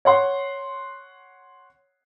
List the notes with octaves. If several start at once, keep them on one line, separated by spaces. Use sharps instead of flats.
C#5 F#5 C6